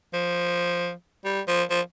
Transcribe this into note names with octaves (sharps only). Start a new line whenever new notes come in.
F3
G3
F3
F3